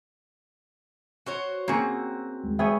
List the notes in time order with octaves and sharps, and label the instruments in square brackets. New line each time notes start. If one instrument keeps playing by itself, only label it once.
[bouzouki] F#4 C5 C#5
[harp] A#3 C#4 G#4 [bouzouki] C4 F#4
[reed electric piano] D#2 G#3
[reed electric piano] G#3 E5 G5 [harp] B3 G#4 C#5